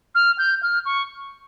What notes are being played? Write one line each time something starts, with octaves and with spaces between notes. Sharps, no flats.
F6
G6
F6
C#6